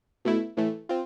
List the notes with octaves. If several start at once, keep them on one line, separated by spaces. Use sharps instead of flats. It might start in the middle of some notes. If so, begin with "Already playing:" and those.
B2 A3 E4
A2 E3 A3
C4 F4